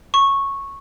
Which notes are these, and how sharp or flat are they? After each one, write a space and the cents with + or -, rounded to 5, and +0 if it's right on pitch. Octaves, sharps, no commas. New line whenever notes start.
C#6 -10